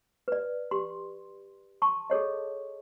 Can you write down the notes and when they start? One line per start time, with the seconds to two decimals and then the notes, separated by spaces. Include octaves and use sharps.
0.28 B4 D5
0.71 G4 C6
1.82 A5 C6 C#6
2.10 G#4 A4 C#5 D#5